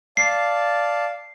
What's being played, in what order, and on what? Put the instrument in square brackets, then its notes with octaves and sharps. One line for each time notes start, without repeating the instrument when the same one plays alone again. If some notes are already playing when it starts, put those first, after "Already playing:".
[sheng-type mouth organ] D5 F5 A5 [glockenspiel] C7